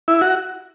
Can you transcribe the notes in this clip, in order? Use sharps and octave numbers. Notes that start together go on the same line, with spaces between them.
E4
F#4